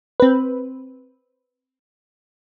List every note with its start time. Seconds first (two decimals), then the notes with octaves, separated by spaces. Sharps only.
0.20 C4 B4